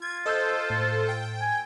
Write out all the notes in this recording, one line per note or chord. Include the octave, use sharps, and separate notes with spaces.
F4 G#6
A4 C5 D#5 E6 G6
A2
G5
G#5